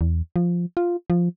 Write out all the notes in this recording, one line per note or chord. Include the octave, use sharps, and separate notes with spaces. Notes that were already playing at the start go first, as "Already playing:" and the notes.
E2
F3
F4
F3